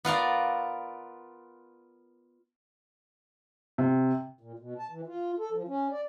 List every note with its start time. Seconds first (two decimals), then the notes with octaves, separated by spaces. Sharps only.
0.05 B3 F4 A#4 D5
3.78 C3
4.41 A#2
4.59 B2
4.79 A5
4.90 E3
5.07 F4
5.39 A4
5.52 F3
5.68 C#4
5.91 D5